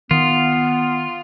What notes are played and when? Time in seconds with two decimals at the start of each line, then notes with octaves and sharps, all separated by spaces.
0.11 D#3 B3 F4